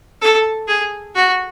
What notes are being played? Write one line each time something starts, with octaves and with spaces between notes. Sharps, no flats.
A4
G#4
F#4